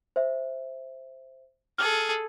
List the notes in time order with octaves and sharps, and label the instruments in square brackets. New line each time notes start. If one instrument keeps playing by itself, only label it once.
[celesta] C5 E5
[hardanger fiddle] G#4 A4 [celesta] F6